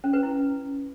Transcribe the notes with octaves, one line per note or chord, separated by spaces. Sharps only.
C#4
B4
E4